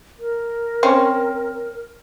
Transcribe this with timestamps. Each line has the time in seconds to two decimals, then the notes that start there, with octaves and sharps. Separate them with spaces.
0.19 A#4
0.83 C4 C#4